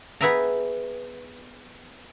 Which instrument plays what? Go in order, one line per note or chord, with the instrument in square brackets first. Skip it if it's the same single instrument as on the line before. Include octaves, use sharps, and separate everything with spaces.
[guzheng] B3 G#4 B4 E5 G5 A#5